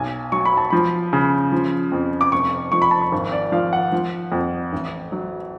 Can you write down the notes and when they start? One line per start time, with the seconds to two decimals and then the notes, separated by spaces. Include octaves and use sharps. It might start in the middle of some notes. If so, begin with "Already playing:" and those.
Already playing: B1 G#5
0.32 F#3 C#6
0.45 B5
0.57 A5
0.70 F3 B5
1.13 C#3
1.52 F3
1.92 F2
2.21 D6
2.32 F1 C#6
2.72 F3 C#6
2.82 B5
2.91 A5
3.02 B5
3.12 G#1
3.32 D5
3.52 F3 F5
3.73 F#5
3.92 F3
4.32 F2
4.73 A1
5.12 F#3